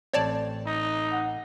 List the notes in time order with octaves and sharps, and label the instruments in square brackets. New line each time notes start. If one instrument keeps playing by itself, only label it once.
[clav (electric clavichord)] A1 C4 [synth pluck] C#5 D5 A5
[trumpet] D#4
[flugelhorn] F#5